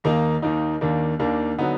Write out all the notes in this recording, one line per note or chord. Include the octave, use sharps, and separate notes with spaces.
D#2 D#3 A#3 D#4
D#2 D#3 A#3 D#4
D#2 D#3 A#3 D4
D#2 D#3 A#3 D4
D3 F#3 B3 D#4